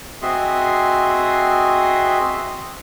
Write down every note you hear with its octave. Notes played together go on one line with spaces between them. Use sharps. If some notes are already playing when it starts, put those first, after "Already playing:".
C4 F#4 G#4 D#5 E5 C6